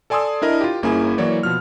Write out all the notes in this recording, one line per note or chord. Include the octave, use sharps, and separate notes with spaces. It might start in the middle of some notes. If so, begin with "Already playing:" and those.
A4 D5 G#5 C6 D#6 E6
D4 E4 A#4 D#5
F4 G4
G1 A#3 C#4 E4 G#4 G#5
E3 F#3 A#3 C#5 D5
B2 F3 F6